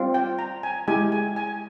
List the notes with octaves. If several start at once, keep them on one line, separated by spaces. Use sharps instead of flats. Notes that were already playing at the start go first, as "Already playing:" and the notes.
Already playing: G3 C4 F4
G5
A#5
G#5
G#3 E4 G4 G#5
G#5
G#5